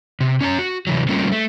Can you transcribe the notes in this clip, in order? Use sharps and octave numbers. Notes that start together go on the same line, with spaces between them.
C3
C#4 D4 C#5 A#5
F#4
C3 E3 F#3
G3 A3 A#3 C4 C#4 F4
A3